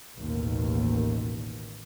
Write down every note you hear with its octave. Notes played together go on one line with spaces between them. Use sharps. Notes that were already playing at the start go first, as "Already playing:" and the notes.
A1 D#2 B2